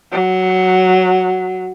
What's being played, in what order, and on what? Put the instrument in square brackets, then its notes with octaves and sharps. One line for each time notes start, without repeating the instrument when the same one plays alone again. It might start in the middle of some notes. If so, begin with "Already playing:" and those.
[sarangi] F#3